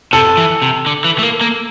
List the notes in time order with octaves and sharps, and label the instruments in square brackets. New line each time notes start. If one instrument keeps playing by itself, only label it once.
[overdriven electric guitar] C3 [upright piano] A4
[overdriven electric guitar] E3
C3
D3
E3
A3
A#3
A#3